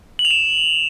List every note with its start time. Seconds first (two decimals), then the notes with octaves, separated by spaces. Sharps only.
0.19 F#7
0.25 F7
0.31 E7